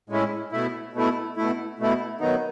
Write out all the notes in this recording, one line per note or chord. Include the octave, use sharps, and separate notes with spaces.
A2 G#3 C#4 E4
B2 A3 E4
B2 A3 E4
B2 A3 E4
B2 A3 E4
D#3 F#3 B3 D#4